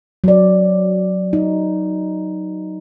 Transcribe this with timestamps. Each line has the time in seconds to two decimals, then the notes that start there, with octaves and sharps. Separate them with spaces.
0.24 F#3 D5
1.33 D#4